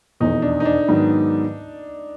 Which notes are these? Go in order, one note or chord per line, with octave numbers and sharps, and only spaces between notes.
F1 E2 B2 D#4
D4
D#4
D4
G#2 D#3 F#3 B3